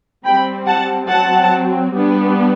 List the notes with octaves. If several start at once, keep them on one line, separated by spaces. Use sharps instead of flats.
G3 C4 G5 B5
F#5 A5
F#3 C4 F#5 A5
G3 B3 D4